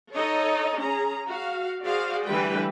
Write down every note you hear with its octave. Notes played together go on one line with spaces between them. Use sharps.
D#4 A4 C#5 D#5
C#4 G#4 A#5
F#4 F5
F#4 G#4 C5 D5 F5
D3 E3 G3 A3 B4 G5